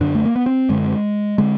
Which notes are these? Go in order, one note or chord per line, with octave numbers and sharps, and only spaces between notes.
F#2 D3 D4
A3
A#3
B3
C4
F#2 D3 G#3
D3 G#3